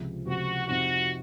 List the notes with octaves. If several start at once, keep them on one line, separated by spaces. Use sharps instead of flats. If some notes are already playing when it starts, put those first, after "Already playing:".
Already playing: C#2 C3 F3
C#2 C3 F3 F#4
F2 C3 F3 C4 D#4 F#4